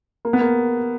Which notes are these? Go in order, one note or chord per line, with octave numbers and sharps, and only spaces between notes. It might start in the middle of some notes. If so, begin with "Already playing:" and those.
A#3
B3
A#3